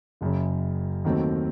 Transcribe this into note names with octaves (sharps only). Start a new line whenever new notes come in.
F#1 F#2 C#3
D#2 D#3 F#3 A3 C4